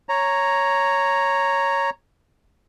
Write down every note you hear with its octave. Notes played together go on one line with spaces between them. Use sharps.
C#5 A#5